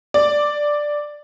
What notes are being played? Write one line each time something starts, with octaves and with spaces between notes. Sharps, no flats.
D5